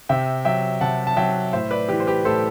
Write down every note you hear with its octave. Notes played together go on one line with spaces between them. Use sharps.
C3 E5 G5
F#3 E5 G5
C3 F#5 A5
A5
F#3 E5 G5
A2 C5 E5
B4 D5
E3 G4 B4
C5
G4 B4
A2 A4 C5